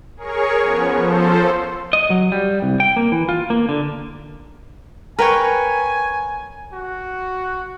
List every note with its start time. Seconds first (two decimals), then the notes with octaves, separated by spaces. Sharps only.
0.16 G#4 A#4 C#5 C#6
0.61 F3 B3 C#4
0.97 F3 A4 C5
1.93 D#5
2.10 F#3
2.32 G3
2.62 C2
2.80 G5
2.96 A#3
3.12 E3
3.29 F4
3.50 A#3
3.69 D3
5.19 A#4 B4 C#5 G5 G#5
6.73 F#4